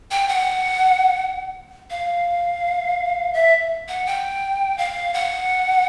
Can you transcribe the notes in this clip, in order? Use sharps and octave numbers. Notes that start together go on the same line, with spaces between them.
G5
F#5
F5
E5
F#5
G5
F5
F#5